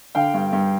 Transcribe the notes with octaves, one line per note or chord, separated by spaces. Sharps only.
D3 F5 G5
G2
G2